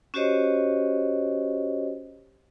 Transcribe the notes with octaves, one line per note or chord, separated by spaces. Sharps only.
C#4 F#4 G4 C5 C#5 D#5